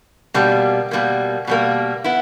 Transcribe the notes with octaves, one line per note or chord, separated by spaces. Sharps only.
B2 G3 A#3
B2 G3 A#3
B2 G3 A#3
B3 E4